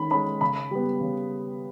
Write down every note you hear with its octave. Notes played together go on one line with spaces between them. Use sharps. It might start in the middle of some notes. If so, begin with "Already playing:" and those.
Already playing: D#3 G#3 C#4 B5
G#3 C#4 B5
C#3 B5
G3 B3
C#3